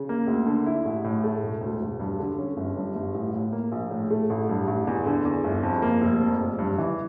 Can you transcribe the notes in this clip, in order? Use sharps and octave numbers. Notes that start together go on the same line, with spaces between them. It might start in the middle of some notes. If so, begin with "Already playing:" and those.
Already playing: C#3
A#3
D2
D3
E4
A1
A2
A3
E1
D2
E1
G2
D3
C#4
G1
G2
G1
A1
A2
A#3
A#1
A2
A3
A1
G2
A1
E2
D3
E2
G1
F2
A#3
F1
F2
F1
G2
E3